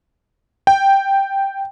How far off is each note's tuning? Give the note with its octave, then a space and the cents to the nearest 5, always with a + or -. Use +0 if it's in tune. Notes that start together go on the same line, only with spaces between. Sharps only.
G5 +0